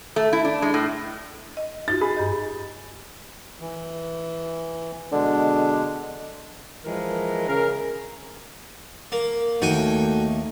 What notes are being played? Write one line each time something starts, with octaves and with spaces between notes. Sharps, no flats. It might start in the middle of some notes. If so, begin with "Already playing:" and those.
A3
E4
D4
G#3
A2
D#5
D#4 F4 F#4 A6
G#4 B5
G2 G4 D#5
E3
B2 D3 G#3 D4
E3 F3 G#3 A#4
C#3 A#4
A#3
D#2 A3 A#3 D#4 F#4 G5 G#5